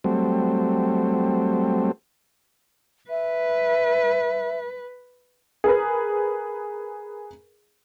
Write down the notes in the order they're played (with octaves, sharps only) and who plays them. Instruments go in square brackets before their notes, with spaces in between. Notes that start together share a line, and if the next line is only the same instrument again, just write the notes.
[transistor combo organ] F#3 G3 A3 C4
[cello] B4 [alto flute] E5
[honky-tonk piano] G#4 A#4 B4